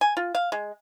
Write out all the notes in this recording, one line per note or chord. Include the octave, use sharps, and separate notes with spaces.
G#5
F4
F5
G#3